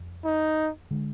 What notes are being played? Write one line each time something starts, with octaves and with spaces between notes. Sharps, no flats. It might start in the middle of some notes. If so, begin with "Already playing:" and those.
Already playing: F2
D#4
D3 G#3